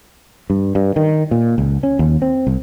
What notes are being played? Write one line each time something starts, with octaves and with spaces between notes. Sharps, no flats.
G2
G2
D#3
A#2
C#2
C#4
D#2
C4
C2